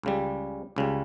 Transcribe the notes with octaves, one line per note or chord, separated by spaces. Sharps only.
C#2 C#3 G3
C#2 C#3 G3